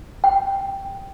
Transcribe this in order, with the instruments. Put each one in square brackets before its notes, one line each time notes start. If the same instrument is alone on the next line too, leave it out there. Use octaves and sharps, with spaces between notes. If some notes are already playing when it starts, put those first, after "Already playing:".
[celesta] G5